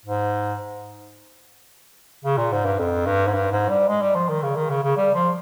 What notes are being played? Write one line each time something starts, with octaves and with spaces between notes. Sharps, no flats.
G#2
C#3
A#2
G#2
G2
F2
G2
G#2
G2
G#2
G3
G#3
G3
F3
D#3
C#3
D#3
C#3
C#3
G3
F3